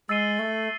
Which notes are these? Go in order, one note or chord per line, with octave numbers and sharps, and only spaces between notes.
G#3 E6 A6 C7 D#7 G7
A3